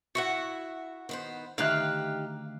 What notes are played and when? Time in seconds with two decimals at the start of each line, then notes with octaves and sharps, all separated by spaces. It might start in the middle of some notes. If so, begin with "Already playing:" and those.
0.15 E4 F#4 E5 F#5
1.09 D#3 B3 C5
1.58 D2 D#3 D#4 G4 E5 F5 F#6